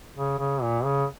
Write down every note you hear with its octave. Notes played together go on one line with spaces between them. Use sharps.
C#3
C#3
A#2
C#3